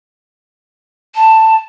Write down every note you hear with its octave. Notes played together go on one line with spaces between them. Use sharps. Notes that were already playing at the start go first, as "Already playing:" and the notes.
A5